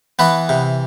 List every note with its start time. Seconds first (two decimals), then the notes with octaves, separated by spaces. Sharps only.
0.19 E3 B3 B4
0.49 C3